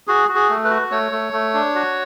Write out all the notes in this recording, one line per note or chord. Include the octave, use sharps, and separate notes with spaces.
F#4 G#4
F#4
G#4
A3
B4
F#4
A3 C#5
A3
A3
D4
F#4